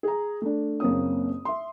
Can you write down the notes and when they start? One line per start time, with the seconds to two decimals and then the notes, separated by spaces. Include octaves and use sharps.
0.03 G#4 A#5
0.42 A3 D4
0.80 F#1 A#3 C4 C#4 D#6
1.45 E5 C6